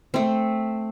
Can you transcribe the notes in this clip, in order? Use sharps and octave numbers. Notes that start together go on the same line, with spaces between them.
A3 C4